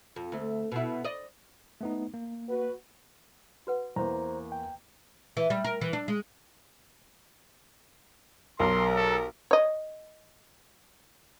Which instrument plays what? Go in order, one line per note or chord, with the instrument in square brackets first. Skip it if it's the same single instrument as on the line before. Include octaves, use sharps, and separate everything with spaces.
[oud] F2
D2 A3
B2 E4
D5 D#5
[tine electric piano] A3 B3 D#4
A#3
[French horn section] F#4 B4
[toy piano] F#4 B4 F#5
[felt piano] E2 A#3 [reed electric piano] C5 A#5
[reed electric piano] G5
[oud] E3
G3
A#4
E3
D4
G#3
[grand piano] B1 [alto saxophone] A#4 [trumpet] C6
[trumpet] A4
[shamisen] C#5 D#5